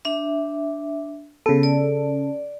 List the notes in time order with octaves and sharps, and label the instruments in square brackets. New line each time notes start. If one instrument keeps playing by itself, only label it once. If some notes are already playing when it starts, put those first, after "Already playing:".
[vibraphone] D4 E5
[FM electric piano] C#3 A4 [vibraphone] B3
[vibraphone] D5